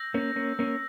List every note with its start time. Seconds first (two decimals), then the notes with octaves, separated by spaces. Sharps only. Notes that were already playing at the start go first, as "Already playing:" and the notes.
Already playing: E6 G6 A#6
0.14 A#3 C#4
0.36 A#3 C#4
0.59 A#3 C#4